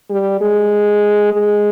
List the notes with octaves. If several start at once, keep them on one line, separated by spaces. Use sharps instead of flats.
G3
G#3
G#3